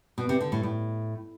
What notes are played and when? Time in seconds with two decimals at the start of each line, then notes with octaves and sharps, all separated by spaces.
0.18 B2
0.29 C3
0.41 D3
0.52 A2
0.63 A2